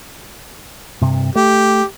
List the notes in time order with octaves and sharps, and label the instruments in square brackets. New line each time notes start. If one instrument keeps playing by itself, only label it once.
[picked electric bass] G2 C3
[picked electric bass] A3 [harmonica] G4